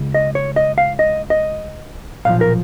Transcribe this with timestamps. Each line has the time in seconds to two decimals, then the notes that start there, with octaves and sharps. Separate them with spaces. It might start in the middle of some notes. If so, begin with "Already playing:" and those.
Already playing: C#2 C#3
0.14 D#5
0.35 C#5
0.56 D#5
0.78 F5
0.99 D#5
1.30 D#5
2.25 B1 A#2 F3 F5
2.41 A#4